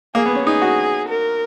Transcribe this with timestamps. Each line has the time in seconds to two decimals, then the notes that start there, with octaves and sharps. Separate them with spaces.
0.15 A#3 G#4
0.26 B3
0.35 C#4
0.46 D#4 G#4
0.62 F#4
1.08 A#4